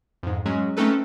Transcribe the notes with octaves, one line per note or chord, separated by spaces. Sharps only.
F2 G#2
F#3 G#3 C#4
A3 C4 C#4 D#4 A4 B4